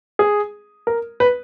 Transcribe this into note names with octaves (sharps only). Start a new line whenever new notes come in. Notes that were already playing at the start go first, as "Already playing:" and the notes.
G#4
A#4
B4